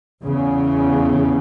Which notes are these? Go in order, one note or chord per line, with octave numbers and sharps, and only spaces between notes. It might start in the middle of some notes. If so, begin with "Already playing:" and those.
E2 C#3